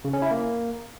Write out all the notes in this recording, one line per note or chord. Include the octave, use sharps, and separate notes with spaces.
C#3
C#4
E4
A#3